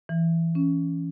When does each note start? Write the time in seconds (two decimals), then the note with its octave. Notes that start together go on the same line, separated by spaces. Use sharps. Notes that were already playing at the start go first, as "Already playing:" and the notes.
0.09 E3
0.55 C#4